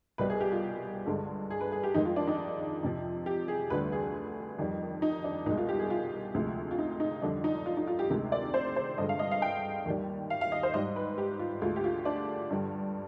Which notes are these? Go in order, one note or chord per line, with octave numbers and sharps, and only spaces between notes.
C2 B2 G3 B4
G#4
G4
F4
G2 D3 G#3
G#4
B4
G#4
G4
F2 D#3 G#3 D#4
F4
D4
D#4
F2 C3 F3
G4
G#4
D2 D3 G3 B4
G#4
F2 D#3 G3
D#4
D4
C2 B2 G#3 D#4
F4
G4
G#4
F4
D2 C3 F3 G#3
F4
D#4
D#4
F2 D3 G3 D4
D#4
F4
D#4
F4
G4
D2 C3 D#3 G#3
D5
C5
C5
G2 D3 G#3 D#5
F5
D#5
F5
G5
D#2 D#3 G3
F5
F5
D#5
C5
G#2 G3 D#5
B4
G4
F4
D2 D3 G#3 F4
G4
F4
D4
G2 D3 G3